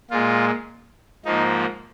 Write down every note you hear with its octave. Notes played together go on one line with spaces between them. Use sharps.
A#2 G#3 F4
G#2 F3 A#3 D#4